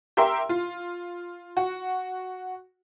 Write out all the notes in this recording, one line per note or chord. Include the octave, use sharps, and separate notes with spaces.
G4 A#4 E5 C6
F4
F#4